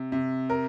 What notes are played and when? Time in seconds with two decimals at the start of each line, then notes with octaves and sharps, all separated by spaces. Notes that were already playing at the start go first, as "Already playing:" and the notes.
Already playing: C3
0.12 C3
0.50 A#4